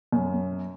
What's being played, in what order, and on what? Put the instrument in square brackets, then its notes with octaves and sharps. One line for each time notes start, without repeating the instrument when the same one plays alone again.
[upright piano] F#2